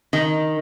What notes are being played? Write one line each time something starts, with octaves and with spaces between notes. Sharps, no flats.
D#3